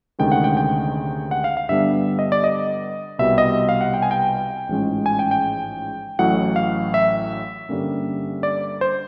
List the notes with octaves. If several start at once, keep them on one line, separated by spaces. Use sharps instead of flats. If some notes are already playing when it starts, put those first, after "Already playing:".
D2 C3 D#3 G#3 C#4 G5
F#5
G5
G5
F#5
F5
F5
G2 D3 G3 B3 D4 E5
D#5
D5
D#5
C2 B2 G3 E5
D#5
F5
F#5
G5
G#5
G5
A1 G#2 F3 G#3 C#4
G#5
G5
G5
A1 A2 F#3 F#5
F5
E5
G2 D3 G3 A#3 C#4
D5
C5